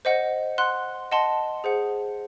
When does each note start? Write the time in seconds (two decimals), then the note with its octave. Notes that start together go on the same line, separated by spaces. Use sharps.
0.05 C5 D#5 F#5
0.58 F#5 C6 F#6
1.11 D#5 F#5 A5 C6
1.64 G#4 C5 F#5